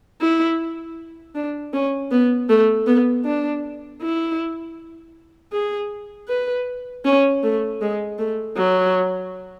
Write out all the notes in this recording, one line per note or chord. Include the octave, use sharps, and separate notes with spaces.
E4
D4
C#4
B3
A3
B3
D4
E4
G#4
B4
C#4
A3
G#3
A3
F#3